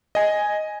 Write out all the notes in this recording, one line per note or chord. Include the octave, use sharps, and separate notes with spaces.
D#5 G#5